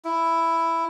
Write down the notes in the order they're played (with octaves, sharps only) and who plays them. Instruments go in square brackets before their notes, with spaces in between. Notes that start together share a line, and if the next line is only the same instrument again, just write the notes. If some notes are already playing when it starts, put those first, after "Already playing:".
[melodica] E4